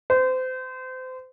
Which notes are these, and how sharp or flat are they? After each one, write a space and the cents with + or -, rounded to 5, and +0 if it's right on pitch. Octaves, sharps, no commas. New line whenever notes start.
C5 -30